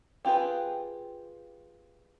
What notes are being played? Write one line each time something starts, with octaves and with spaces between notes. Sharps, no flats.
C4 F4 G4 G#4 B4